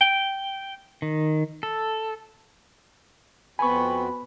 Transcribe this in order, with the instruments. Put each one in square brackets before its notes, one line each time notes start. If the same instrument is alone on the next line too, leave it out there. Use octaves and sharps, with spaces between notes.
[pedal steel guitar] G5
D#3
A4
[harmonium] F2 C4 F#4 [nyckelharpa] B3 B4 [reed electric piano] G#5 C#6 [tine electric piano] B5